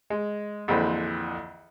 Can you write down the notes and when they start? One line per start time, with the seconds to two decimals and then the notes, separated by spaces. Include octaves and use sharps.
0.10 G#3
0.68 A#1 F2 D3 E3 C5 B5